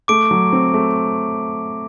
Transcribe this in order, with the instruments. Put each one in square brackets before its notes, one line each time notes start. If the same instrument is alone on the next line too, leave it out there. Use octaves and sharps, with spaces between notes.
[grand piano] A3 [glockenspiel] D6 D7
[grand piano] F#3
C4
A3